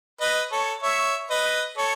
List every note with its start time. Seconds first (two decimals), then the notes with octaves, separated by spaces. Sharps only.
0.21 B4 D#5
0.52 A4 C#5
0.83 C#5 E5
1.30 B4 D#5
1.78 A4 C#5